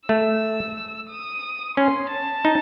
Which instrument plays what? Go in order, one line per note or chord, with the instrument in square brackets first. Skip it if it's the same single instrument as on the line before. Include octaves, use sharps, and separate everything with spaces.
[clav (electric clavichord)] A3 [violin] E6
[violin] D#6
[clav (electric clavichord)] C#4 [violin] C6
[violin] A5
[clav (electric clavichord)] D#4